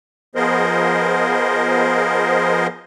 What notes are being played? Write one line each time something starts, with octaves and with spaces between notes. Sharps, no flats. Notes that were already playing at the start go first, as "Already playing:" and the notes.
F3 B3 G#4 A#4 C5 D#5